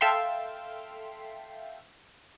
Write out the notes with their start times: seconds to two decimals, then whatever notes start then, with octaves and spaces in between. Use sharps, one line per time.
0.01 A4 E5 F5 G5 C6